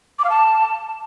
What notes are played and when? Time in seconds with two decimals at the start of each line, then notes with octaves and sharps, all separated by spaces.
0.19 D6
0.24 F5
0.30 A5